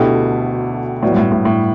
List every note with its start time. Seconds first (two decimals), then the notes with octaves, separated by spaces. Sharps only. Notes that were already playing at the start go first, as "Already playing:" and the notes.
Already playing: D2 B2 D3 A3 E4 G4
1.02 A2 F#3 B3 F#4 B4 D5
1.12 G2
1.17 A2
1.32 A2
1.45 A2